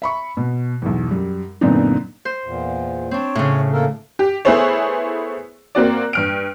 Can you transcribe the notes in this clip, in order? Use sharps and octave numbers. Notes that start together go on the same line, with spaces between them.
E5 B5 C#6
B2
B1 E2
F#2 G3
F#2 A#2 D3 B3 C4 D#4
C5
E2 A#2
C4 D4 C#5
A2 C#3
A#3 A4 A#4
G4
A3 B3 E4 G#4 C5 C#5
A#3 C4 F#4 D5
G2 F6 D7